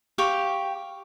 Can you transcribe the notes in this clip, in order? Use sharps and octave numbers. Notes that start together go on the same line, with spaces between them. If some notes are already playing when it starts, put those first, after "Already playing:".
G4 F5 G5 C#6